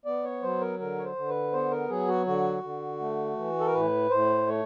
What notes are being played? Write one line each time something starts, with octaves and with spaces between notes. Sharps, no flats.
B3 D5
C#5
F#3 C5
A#4
D3 A#4
C#5
C5
D3
B4
B3 C5
A#4
F#3 G#4
F#4
D3 F#4
D3
A3
E3
A4
A#4
A2 B4
A2 C5
A3 C#5